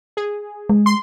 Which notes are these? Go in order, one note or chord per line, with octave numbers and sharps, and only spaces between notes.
G#4
G#3
C6